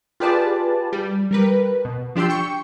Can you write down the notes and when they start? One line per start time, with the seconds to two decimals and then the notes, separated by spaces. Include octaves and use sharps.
0.20 F4 G4 G#4 B4 D5 A5
0.93 G3
1.31 G3 A#4 B4
1.85 B2
2.16 F3 D4 G4 C6 E6
2.30 G5 C#6